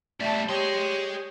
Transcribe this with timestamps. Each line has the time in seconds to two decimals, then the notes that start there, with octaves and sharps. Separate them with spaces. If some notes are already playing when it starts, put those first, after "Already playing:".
0.21 G3 A3 D5 A5
0.49 G4 G#4 C#5 C6